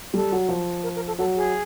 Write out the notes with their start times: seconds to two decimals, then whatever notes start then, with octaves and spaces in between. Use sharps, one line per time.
0.14 G3 A4
0.32 F#3
0.49 F3
0.83 A#4
0.96 A#4
1.07 A4
1.19 F#3 A4
1.36 G#4